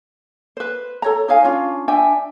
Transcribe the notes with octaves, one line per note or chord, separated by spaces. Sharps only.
B4 C5
A4 C#5 A#5
D#4 C#5 F5 G#5
C#4 D4 F4
D4 E5 G5 G#5